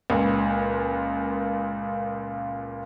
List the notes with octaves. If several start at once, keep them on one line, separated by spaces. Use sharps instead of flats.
C#2 A#2